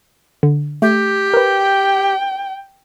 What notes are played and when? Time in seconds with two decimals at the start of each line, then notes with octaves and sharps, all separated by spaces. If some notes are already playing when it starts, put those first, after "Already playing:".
0.43 D3
0.82 A3 G4
1.34 A#4 B4 G5